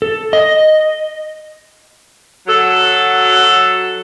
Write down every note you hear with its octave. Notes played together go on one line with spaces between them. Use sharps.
A4
D#5
F#3 A4